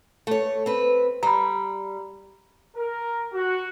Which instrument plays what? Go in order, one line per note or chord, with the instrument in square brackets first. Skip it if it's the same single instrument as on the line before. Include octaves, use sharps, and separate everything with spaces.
[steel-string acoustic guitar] A3 C#5
C4 B4
[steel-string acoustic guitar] G3 [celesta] A#5 B5
[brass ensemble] A#4
F#4